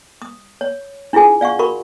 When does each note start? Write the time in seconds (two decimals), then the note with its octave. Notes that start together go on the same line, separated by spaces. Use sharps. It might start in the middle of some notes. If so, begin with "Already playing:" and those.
0.22 D#6
0.61 C#5
1.13 D4 E4 F4 G#4 G#5
1.41 D5 F5 F#5 C#6
1.59 F#4 A#4 B5 C#6